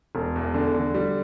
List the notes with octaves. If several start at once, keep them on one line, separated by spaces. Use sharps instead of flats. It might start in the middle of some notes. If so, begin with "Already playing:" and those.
E1
E2
D3
D3
G3